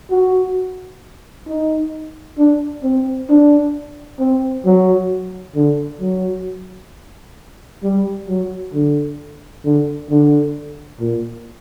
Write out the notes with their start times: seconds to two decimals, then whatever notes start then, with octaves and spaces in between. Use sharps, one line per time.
0.11 F#4
1.47 D#4
2.38 D4
2.83 C4
3.29 D4
4.19 C4
4.65 F#3
5.55 D3
6.01 F#3
7.83 G3
8.28 F#3
8.74 D3
9.65 D3
10.10 D3
11.00 A#2